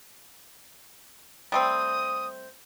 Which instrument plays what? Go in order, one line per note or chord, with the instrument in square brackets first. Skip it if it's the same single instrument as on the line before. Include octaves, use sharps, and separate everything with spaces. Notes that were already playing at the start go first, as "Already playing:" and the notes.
[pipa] G3 A3 C4 [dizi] D#6